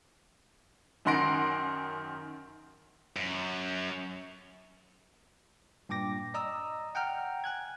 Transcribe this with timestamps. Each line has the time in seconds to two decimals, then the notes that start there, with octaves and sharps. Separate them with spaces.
1.05 F#2 D#3 F#5 C6 A#6 D7
3.16 F#2
5.89 G2 A#2 G5 D6 A#6
6.34 D5 D#5 A#5 D#6 E6
6.95 F#5 G5 A#5 F6
7.44 G#5 F#6 G#6